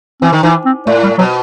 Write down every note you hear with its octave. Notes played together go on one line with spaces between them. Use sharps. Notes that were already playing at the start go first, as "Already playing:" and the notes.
E3 C4
D#3
E3 D#4
C4
A2 A3
G3
B2 F#3